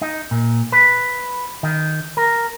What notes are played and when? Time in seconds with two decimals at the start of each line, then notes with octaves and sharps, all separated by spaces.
0.01 D#4
0.31 A#2
0.72 B4
1.63 D#3
2.17 A#4